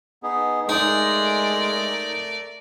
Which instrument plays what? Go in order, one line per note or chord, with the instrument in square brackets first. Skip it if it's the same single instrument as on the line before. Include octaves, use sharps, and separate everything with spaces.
[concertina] B3 D#4 G#4
[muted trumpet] G#3 [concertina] A3 [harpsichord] D#4 [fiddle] A#4 D5